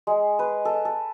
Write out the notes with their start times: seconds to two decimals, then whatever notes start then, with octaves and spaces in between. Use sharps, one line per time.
0.07 G#3
0.39 B4
0.65 A4
0.85 A4